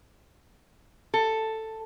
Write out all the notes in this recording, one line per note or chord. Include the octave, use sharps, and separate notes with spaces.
A4